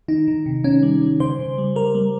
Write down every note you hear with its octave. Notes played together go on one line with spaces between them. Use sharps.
D#3 D#4
D#3
C3
D#3 C#4
G3
G3
C#3 C5
C#3
G3
G3 A#4
G3